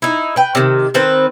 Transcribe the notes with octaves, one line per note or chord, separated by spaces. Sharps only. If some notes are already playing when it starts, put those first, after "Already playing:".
D#4 E4
B4 G5
C3 D#3
D#3 C4 B4 C5